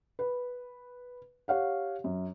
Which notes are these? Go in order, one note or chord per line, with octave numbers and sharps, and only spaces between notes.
B4
G4 C#5 F5 F#5
F#2